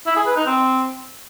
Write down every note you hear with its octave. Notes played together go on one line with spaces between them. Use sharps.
E4
G#4
B4
D#4
C4